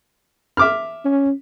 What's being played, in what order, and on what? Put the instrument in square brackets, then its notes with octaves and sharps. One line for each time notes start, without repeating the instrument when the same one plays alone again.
[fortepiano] E5 D6 F6
[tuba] C#4